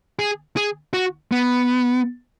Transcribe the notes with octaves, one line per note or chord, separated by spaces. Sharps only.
G#4
G#4
F#4
B3